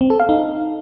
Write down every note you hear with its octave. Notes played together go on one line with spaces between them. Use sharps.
C4
A4
F5
D#4